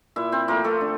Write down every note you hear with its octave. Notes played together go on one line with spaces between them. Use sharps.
A#2 E4 E5
C4 C5
F3 A3 A#3 A#4
A3 A4
D3